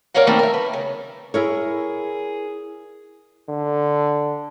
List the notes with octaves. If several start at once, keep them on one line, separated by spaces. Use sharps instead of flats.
D2 A#4 C#5 D5 F5 F#5
D#3 E3 G3 A3 A#3 C4
A#4 E5
B4
C#3
E4 G#4 A#4 C#5
D3